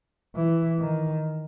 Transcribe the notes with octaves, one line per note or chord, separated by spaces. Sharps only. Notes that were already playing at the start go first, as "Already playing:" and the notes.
E3
D#3